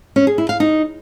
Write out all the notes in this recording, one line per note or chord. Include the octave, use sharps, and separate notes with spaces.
C#4
G#4
E4
F5
D#4